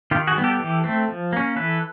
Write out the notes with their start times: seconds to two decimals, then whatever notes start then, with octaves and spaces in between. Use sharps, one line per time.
0.11 D#3 F4 G4
0.27 F#4 G#4
0.36 G3 B3
0.44 G4 A4
0.60 E3
0.84 A3 C4
1.08 F3
1.33 A#3 C#4
1.56 E3 A4 B4